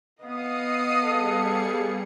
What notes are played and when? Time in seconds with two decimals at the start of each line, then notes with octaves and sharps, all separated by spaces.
0.23 B3 D#5 F5 D#6 C7 C#7 D#7
1.03 G3 G#4 A4 C#7